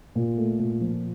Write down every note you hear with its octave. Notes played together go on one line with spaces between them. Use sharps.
A#2
A3
A#2
F3